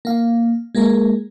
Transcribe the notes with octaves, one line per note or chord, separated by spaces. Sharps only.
A#3 F5
G#3 A#3 G#4 A#4